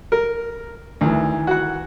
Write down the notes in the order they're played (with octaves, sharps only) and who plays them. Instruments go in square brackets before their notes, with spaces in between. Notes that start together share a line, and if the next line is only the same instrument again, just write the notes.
[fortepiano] A#4
[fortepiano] D2 [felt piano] D#3 E3
[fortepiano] F#4 F#5